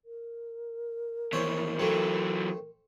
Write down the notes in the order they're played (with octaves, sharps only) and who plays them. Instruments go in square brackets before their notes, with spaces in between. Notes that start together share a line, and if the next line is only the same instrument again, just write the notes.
[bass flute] A#4
[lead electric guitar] D#2 E3 [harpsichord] C5 C#5
[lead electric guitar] E3 F#3 [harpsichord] A3 C4